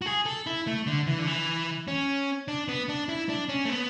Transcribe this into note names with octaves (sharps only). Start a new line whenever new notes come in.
F#4
G#4
A4
E4
A3
D3
E3
D3
E3
C#4
D4
B3
D4
E4
D4
C#4
A3
B3